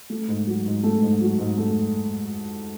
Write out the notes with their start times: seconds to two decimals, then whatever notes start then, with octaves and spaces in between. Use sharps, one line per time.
0.10 A3
0.28 G#2
0.47 F#3
0.66 G#2
0.83 A3
1.02 G#2
1.21 F#3
1.39 G#2
1.57 A3